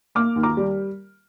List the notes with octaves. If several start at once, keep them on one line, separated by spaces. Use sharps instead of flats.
A#3 D6 F6
D#2
A#5 D6
G3